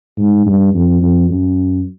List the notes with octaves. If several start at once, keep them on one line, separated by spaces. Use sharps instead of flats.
G#2
G2
F2
F2
F#2